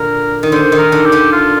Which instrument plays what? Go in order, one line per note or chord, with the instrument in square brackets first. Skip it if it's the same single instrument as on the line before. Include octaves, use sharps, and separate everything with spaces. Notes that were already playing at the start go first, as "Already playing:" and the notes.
Already playing: [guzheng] A#2 D3 [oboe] A#4
[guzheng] D#3
[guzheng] D3 [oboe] C5
[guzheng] D#3
[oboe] A#4
[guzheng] D3 D4
[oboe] G4
[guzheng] D3 D4
[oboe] F4